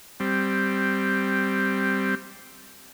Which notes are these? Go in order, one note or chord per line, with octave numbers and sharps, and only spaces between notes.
G3 C4